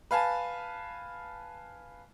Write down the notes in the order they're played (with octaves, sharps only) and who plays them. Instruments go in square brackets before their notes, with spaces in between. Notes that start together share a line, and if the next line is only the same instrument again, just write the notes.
[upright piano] B4 F5 G#5 A5